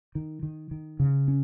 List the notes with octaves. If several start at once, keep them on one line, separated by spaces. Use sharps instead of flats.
D#3
D#3
D#3
C#3
C#4